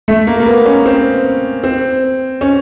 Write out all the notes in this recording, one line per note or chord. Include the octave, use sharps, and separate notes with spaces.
A3
A#3
A#3
B3
C#4
C4
C4
C#4